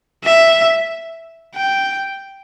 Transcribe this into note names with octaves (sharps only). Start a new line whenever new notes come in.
E5
G5